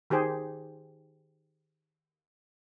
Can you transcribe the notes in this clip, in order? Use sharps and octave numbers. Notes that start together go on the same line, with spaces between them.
D#3 G4 G#4 C5